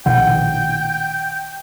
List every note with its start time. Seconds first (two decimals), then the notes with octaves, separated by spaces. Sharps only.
0.06 A#1 B2 D#3 F#5 G5